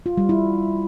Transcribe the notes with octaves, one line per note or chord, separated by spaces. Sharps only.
F4
G3
E4